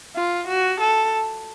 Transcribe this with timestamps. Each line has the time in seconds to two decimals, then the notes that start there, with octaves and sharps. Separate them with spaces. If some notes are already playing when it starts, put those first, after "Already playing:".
0.16 F4
0.47 F#4
0.80 A4